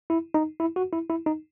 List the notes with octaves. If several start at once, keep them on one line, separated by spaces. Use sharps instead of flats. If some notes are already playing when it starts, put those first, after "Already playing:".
E4
D#4
E4
F#4
E4
E4
D#4